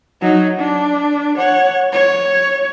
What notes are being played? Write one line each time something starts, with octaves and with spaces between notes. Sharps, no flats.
F#3 D#4
D4
C#5 F#5
C#5